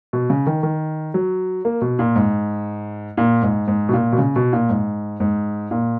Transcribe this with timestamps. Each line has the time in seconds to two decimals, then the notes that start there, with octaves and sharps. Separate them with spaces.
0.13 B2
0.30 C#3
0.46 D#3
0.63 D#3
1.14 F#3
1.65 A#3
1.81 B2
1.99 A#2
2.16 G#2
3.17 A#2
3.42 G#2
3.68 G#2
3.89 B2
3.93 A#2
4.12 B2
4.18 C#3
4.36 B2
4.53 A#2
4.69 G#2
5.20 G#2
5.71 A#2